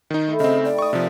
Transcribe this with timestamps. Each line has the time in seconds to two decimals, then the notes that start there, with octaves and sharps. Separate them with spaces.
0.11 D#3 D#4
0.27 A3 E4
0.40 C#3 C4 D#4 A4 D#5
0.65 G4 D5 B5
0.79 E5 A5 C#6 D#6
0.93 C3 F3 A#3 F4